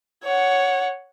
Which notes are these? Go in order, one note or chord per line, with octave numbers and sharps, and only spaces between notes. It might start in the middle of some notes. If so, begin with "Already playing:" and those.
C#5 F#5